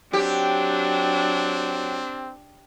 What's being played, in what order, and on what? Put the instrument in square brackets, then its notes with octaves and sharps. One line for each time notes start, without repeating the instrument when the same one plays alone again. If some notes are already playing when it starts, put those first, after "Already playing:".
[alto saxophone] F#3 [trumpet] C4 [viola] D4 [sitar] G4